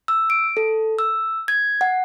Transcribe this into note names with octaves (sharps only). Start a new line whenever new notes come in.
E6
D7
A4
E6
G#6
F#5